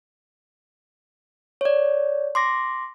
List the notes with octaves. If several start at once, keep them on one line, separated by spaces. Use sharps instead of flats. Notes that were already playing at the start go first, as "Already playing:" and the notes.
C#5 D5
C6 D6 A#6